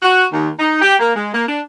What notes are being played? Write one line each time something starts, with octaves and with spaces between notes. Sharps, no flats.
F#4
D#2
D#4
G4
A#3
G#3
A#3
D4